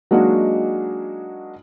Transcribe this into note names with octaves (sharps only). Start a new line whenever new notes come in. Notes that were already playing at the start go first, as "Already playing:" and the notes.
F#3 G#3 A#3 D4 D#4 F#4